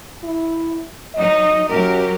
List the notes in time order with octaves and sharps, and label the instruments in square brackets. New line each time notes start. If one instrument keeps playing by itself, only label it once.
[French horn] E4
[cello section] F#3 D#4 [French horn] D#5
[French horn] F#2 [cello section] F#3 G4 A#4